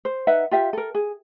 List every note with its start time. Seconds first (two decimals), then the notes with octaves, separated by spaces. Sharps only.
0.05 C5
0.27 D#4 B4 E5 F#5
0.51 F4 G4 E5 F5
0.73 A4 A#4
0.95 G#4